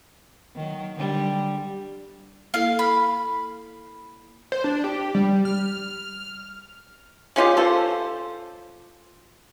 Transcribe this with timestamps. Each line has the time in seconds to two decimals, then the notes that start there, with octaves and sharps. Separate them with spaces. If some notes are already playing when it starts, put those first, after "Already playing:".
0.56 D#3 F#3
0.95 D3 G3
2.54 A#3 E4 A4 F5
2.79 B5
4.52 C5
4.64 D4
4.84 G4
5.15 G3
5.45 F6
7.36 G#3 C#4 F4 G4
7.57 F4 A4 C5